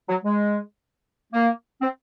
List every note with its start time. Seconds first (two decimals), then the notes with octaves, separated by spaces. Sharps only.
0.08 F#3
0.24 G#3
1.33 A#3
1.81 C4